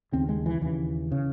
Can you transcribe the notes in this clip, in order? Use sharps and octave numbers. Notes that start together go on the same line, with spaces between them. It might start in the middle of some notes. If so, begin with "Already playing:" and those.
D#2 C#3 C4
G#3
E3
D#2 C#3 E3
C#3